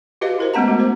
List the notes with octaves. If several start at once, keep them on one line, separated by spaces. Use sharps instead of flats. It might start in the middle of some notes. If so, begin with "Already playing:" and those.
F#4 G4 B4 D#5 F5
E4 A#4 C5
G#3 A3 B3 C#4 A5 A#5
G#3 A3 F#4
C5